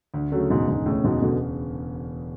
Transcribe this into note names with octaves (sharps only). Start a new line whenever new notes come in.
D2
C#3 F#3 A3
E1 G#2 B2
D2 G#2
A2 C#3
E1 G#2 B2
B2 D3